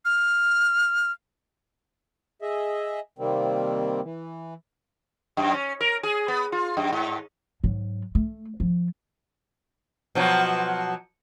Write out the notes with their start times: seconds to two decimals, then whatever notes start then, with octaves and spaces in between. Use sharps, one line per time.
0.05 F6
2.42 G#4 D#5 E5
3.19 C3 D#3 G3 A#3 C4
4.03 E3
5.37 F#2
5.54 C#4
5.81 A#4
6.03 G#4
6.28 B3
6.52 F4
6.77 F#2
6.92 G#2
7.64 G#2 F#3
8.15 A3
8.60 F3
10.15 B2 F3 F#3